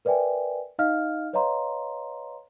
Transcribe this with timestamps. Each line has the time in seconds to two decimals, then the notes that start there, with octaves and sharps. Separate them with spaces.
0.05 A#4 B4 D5 E5 G5 G#5
0.79 D#4 D#5 F5 F6
1.33 B4 C#5 D#5 F5 A#5 C6